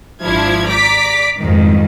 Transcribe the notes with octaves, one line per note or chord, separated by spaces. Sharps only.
G#1 F3 D4 E4 G#6
D5 A#5 D6 B6
C2 F2 G#2 D#3